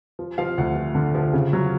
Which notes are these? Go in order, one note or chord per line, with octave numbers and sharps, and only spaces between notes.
F3
F3 F5
D2 F#5
F3
D3
F3
C#3
F#3